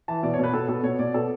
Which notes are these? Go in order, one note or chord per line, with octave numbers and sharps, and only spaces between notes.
E3 A5
B2 D5
C#5
B2 B4
B2 A4
B2 A4
B2 C#5
B2 D5
B2 A4